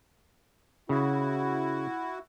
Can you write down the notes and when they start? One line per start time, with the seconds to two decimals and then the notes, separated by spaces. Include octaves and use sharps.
0.89 C#3 E4 F#4